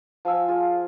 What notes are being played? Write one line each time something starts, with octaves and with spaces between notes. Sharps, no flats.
F3 F5 G#5 E6
F4 G#4